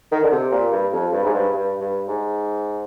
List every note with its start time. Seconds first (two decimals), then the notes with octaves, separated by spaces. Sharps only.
0.12 D#3
0.23 D3
0.32 C3
0.51 A#2
0.72 G2
0.93 F2
1.12 G2
1.24 G#2
1.34 G2
1.53 G2
1.81 G2
2.08 G#2